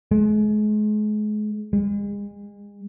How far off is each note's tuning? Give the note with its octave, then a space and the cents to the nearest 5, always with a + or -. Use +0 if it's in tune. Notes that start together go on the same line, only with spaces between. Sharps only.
G#3 +35
G#3 -35